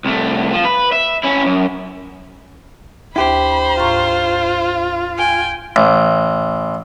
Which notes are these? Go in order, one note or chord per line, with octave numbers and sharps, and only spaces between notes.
C2 A3
F3
B4
E5
C#4 E4
F#2
D2 E4 G4 C5 B5
G#2 F4 A#5 C#6
G5 G#5
A1